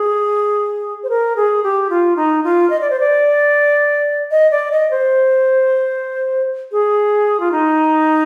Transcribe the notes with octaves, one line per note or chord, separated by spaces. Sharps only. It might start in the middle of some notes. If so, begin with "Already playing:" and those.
Already playing: G#4
C5
A#4
G#4
G4
F4
D#4
F4
D#5
D5
C5
D5
D#5
D5
D#5
C5
G#4
F4
D#4